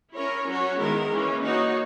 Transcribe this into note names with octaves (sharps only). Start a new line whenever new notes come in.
C#4 E4 A#4 C#5
F#3 C#4 F#4 C#5
D#3 G#3 B3 E4 A#4
E3 A#3 C#4
A#3 D#4 F#4 C#5